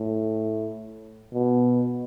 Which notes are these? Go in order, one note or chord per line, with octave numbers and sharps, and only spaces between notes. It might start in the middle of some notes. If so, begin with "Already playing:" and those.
Already playing: A2
B2